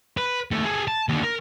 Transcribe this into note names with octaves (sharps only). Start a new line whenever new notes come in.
B4
D#2 A3
G#4 A4
A5
D#2 D3
A#4